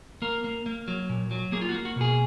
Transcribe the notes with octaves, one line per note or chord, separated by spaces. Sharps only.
A#3 A#4
A#3
A#3
F#3
A#2
F#3
A#3 G#4
F4
F#4
A#3
F#4
B2 G#4